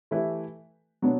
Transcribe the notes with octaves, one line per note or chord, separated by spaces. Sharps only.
E3 A3 E4 G4 B4
B2 F#3 B3 D4